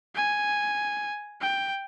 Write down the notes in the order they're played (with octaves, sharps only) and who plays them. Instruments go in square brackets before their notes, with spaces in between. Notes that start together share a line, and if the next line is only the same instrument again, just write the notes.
[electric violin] G#5
G5